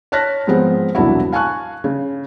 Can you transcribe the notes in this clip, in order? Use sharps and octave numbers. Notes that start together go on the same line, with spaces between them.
C#5 A5 F6 F#6 A#6 B6
G#2 F3 G#3 B3 C4
E1 C2 F#3 D4 E4 F#4
F5 G#5 A5 C#6 F#6
C#3